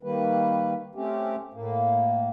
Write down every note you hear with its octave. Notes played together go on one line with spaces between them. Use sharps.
D#3 G3 A#3 B4
A3 C4 C#4 G4
A2 A#3